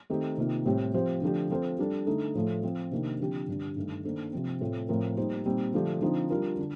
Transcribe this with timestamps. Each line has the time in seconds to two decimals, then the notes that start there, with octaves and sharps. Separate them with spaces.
0.10 D#3 A3 C4 D#4 G4
0.37 C3 D#3 A#3 F4
0.66 A2 G3 C4 G4
0.94 F3 C4 G4 C5
1.22 D3 F3 A3 D4 G4
1.50 F3 C4 F4 A4 C5
1.78 G3 D4 A4
2.07 D3 A3 D#4
2.35 A2 F3 A3
2.63 F3 C4 F4
2.91 C3 D#3 A#3 D4
3.20 D3 F3 C4 G4
3.48 G2 D3 G3 D4
3.76 G2 D#3 A3
4.05 D#3 A#3 D4 A4 C5
4.32 C3 F3 C4
4.61 A2 A3 C4 F4
4.89 A2 F3 C4 F4 A#4
5.17 G3 A#3 D#4 G4 C5
5.45 A#2 G3 C4 D#4
5.74 D3 F3 A3 D4 G4
6.02 D3 F3 C4 D#4
6.30 G3 D4 F4 A#4
6.58 D3